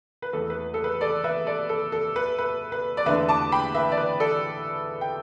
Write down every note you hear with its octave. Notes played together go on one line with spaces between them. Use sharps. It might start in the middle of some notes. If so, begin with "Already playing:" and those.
B4
E2 E3 A3 A4
B4
A4
B4
A4 D5
B4 E5
A4 D5
A4
A4
B4
B4
B4
D5
E2 D3 A3 B4 E5
A5 D6
G5 B5
B4 E5
D5
B4
A4 D5
G5